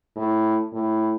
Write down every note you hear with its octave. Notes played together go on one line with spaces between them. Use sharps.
A2
A2